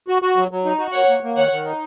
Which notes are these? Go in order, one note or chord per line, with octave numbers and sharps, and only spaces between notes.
F#4
F#4
F#3
F#3
D#4
F#4
A#3 C#5 F#5
A#3
A#3
D#3 C#5 F#5
D#3
D#4